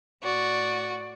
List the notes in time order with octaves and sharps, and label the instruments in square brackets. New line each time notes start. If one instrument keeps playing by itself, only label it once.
[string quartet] A2 D5 [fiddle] F#4